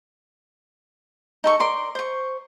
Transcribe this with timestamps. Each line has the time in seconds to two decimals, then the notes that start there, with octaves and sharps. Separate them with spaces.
1.44 D#4 A4 C#6
1.60 A#4 D5 C6
1.95 C5 C#6